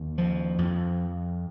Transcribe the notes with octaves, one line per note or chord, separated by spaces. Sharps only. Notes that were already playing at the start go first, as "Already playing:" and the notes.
Already playing: D#2
F3
F2